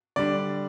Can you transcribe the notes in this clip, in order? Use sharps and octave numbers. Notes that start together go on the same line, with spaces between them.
D3 G3 D4 D5